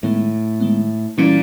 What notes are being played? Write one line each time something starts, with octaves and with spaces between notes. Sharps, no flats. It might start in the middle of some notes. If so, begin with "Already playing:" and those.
A2 D#3 G#3 B3
D#3 G#3 B3
A#2 E3 G3 A#3 C#4 E4